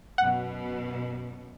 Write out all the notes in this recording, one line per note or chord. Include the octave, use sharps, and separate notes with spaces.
F#2 B2 F#5